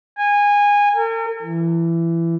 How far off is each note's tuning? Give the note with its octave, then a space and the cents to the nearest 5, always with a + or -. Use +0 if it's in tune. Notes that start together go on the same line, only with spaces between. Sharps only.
G#5 -20
A#4 -45
E3 +20